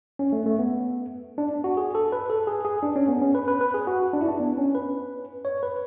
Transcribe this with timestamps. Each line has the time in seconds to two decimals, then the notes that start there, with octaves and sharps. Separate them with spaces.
0.19 C#4
0.33 A3
0.46 A3
0.59 B3
1.38 D4
1.64 F#4
1.77 G#4
1.95 A4
2.12 B4
2.30 A4
2.47 G#4
2.65 G#4
2.83 D4
2.96 C#4
3.08 B3
3.22 C#4
3.35 B4
3.48 B4
3.61 B4
3.74 G#4
3.87 F#4
4.13 D4
4.21 E4
4.28 D4
4.40 B3
4.58 C#4
4.75 B4
5.45 C#5
5.63 B4